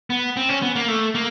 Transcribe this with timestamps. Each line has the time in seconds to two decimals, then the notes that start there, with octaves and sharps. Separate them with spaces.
0.10 B3
0.37 C4
0.49 C#4
0.62 B3
0.76 A#3
0.88 A3
1.15 A#3